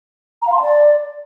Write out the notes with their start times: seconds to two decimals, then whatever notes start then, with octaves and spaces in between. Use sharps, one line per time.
0.42 A#5
0.47 F5
0.52 C6
0.57 A5
0.62 D5